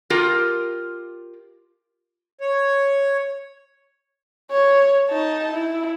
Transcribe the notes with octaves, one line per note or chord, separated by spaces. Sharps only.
F4 G4 A#4
C#5
C#5
D#4 A5
E4